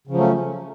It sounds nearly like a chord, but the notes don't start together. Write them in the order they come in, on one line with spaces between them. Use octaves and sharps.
C#3 F3 F#3 A3 C#4